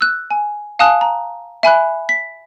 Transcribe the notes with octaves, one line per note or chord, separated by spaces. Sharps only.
E6 F#6
G#5
F5 G#5 A5 D#6 F#6
A#5
E5 G#5 B5 F#6
B6